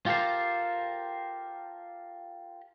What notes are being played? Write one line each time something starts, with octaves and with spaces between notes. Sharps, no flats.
F4 G4 A4 A#4 C5